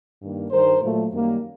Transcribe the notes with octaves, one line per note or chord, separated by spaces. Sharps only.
G2 D#3 G3 A#3
G2 D#3 G3 A#4 C5
A#2 F#3 A3
F#2 D#3 G3 A#3